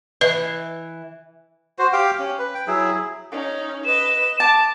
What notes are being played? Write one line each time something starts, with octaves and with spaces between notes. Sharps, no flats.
E3 B4 D#5
F#4 C5
G4 F5 G5
C#4
B4
G5
F#3 E4 G#4
C#4 D#4
B4 D#5 E7
A5 D6